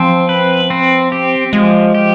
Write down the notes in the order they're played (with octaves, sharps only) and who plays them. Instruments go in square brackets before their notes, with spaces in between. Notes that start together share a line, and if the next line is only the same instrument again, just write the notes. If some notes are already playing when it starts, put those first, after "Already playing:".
Already playing: [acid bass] F3 [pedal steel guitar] C4
[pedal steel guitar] B4
C4
G4
[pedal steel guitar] F3 [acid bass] G#3
[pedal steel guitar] G4